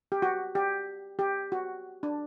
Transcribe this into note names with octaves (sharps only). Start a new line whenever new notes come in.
G4
F#4
G4
G4
F#4
D4